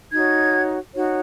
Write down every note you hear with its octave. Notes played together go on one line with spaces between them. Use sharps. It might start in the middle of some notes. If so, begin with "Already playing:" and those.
D#4 F#4 C#5 G#6
D#4 F#4 C#5